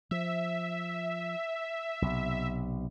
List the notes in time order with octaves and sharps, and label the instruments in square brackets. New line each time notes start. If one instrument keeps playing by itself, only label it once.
[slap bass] F3 [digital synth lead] E5
[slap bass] B1 C3